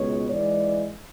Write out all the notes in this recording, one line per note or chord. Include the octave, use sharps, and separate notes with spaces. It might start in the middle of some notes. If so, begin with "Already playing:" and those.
Already playing: C#2 B2 G#3 C#5
G#2 E3 G#3 D5